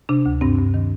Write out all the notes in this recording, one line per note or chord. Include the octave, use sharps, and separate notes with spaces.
C3 D4
D2
G2 C4
G2
D#3